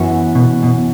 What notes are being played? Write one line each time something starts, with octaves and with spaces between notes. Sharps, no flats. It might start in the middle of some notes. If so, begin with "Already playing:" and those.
Already playing: F#2 E3 B3 F#4
B2
B2